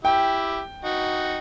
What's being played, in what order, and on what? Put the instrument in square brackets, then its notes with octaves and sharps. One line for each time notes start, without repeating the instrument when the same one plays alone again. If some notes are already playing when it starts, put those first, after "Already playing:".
[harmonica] E4 G4 [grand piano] G5
[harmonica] D#4 F#4